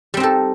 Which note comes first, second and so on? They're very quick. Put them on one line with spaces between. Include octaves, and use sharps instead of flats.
G3 C4 D#4 A4